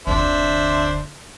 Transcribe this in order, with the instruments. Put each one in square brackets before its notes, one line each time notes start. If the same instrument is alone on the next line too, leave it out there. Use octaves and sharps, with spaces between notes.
[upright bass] F1 D2 [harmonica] D4 C5 E5